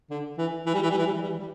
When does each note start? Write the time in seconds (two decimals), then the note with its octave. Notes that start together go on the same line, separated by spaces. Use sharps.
0.10 D3
0.38 E3
0.66 E3
0.74 G3
0.82 E3
0.90 G3
0.98 E3
1.06 G3
1.14 E3
1.22 G3
1.30 E3
1.39 G3